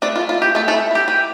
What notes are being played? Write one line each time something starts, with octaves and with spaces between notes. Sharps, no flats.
A3 D4 D5
F4
A3
F4
A3 G4
A3 E4 A4
A3 A4
E4
E4 G4
E3 G4